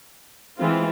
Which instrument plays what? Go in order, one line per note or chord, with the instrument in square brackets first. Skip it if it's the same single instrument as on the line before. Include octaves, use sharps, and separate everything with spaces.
[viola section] E3 G#3 C4 F4